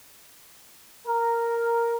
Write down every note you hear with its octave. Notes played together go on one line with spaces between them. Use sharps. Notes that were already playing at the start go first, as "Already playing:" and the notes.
A#4